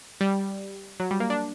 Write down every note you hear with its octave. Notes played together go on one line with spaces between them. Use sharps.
G3
F#3
G3
A#3
D4